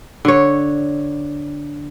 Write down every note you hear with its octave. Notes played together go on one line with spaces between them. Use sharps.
D3 C#5